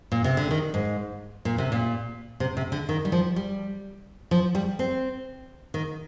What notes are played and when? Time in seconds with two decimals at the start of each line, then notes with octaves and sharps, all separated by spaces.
0.12 A#2
0.24 C3
0.37 D3
0.51 D#3
0.74 G#2
1.45 A#2
1.58 C3
1.72 A#2
2.40 C3
2.57 C3
2.72 D3
2.89 D#3
3.05 G3
3.12 F3
3.36 G3
4.31 F3
4.55 G3
4.79 C4
5.74 D#3